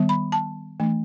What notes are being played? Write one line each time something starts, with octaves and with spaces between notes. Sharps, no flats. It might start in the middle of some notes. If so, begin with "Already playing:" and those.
Already playing: D#3 G3 B3
B5
A5
E3 A3 D4